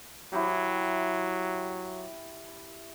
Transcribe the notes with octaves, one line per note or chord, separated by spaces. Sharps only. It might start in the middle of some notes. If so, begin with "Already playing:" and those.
F#3 E4 G4